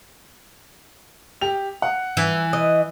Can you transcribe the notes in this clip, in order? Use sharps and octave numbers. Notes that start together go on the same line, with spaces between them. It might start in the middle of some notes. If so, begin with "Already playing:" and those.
G4 F7
F#5
E3
D#5